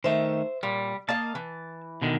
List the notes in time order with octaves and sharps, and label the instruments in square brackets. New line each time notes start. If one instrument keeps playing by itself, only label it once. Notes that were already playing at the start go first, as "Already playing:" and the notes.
[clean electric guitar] D#3 A3 [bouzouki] C5 E5
[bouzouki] A#2 [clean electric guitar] G3
[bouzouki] A#3 D#5 F5 [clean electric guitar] A5
[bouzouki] E3
[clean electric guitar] B2 D3 D#3